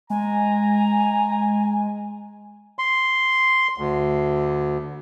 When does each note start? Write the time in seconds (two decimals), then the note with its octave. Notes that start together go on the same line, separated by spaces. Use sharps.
0.10 G#3 G#5 A#5
2.79 C6
3.78 D2